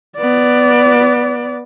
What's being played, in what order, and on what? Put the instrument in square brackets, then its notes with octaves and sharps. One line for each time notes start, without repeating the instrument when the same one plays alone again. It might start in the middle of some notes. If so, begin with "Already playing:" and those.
[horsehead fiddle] B3 D5